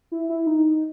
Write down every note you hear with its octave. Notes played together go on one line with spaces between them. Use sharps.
E4
E4
D#4